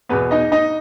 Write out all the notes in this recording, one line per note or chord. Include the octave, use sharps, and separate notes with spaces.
E2 B2 B3 B4
D#4 D#5
D#4 D#5